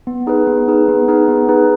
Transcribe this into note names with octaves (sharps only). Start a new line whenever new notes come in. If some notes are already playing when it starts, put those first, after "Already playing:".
B3
D#4 G#4 B4
B3
D#4 G#4 B4
B3
D#4 G#4 B4
B3
D#4 G#4 B4